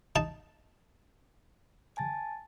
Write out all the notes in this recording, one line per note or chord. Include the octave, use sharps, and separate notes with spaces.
D#4 A5
G#5 A5 A6